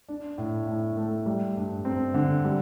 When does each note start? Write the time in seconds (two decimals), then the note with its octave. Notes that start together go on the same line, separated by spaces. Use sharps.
0.08 D4
0.38 A2
0.67 A2
0.97 A3
1.26 G3
1.57 G2
1.85 C4
2.14 D3
2.44 G3